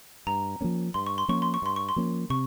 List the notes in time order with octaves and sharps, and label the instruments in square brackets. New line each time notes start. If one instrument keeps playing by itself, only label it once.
[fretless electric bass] G2 [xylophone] A#5
[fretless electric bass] F3 A#3 C#4
[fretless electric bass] G2 [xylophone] C6
[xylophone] C#6
C6
[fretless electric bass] F3 A#3 C#4 [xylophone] C#6
[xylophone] C6
C#6
[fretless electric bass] G2 [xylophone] C6
[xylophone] C#6
C6
[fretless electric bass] F3 A#3 C#4
[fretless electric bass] C3 [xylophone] C#6